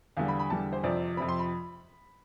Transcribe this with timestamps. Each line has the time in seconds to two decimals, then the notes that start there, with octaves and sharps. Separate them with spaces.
0.17 E2 D3 G3 F5
0.28 B5
0.39 B5
0.50 E2 D3 G3 A5
0.73 C5
0.84 F2 C3 F3 C4 D5
1.17 F2 C3 F3 C4 B5
1.29 C6
1.39 B5